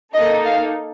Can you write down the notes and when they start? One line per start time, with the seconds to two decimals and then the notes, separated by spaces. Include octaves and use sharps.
0.14 A#3 D#4 A4 D#5
0.44 F5